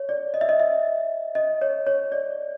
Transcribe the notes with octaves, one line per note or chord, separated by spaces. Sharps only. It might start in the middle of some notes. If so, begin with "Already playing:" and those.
Already playing: C#5
D5
D#5
E5
D#5
E5
D#5
C#5
C#5
D5